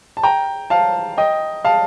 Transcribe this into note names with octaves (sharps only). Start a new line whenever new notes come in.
A5
G5 A#5
F5 A5
D#5 G5
F5 A5